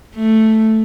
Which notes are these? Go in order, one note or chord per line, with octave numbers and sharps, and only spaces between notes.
A3